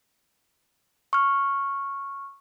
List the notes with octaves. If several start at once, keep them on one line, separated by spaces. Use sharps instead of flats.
C#6 F6